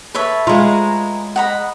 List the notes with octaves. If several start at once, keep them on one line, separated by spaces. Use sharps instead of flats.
A4 B4 C#5 E5
G#3 F4 A#5
D#5 F#5 A#5 B5